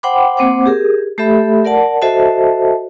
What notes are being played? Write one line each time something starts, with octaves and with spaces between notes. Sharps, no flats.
C5 F#5 G5 B5 C6 D6
A#3 C4 C5 F#5 D6
G4 G#4 A#4
A3 G4 A4 E5 B5
A#4 D5 F#5 A5
F#4 A4 C5 D#5 E5 A5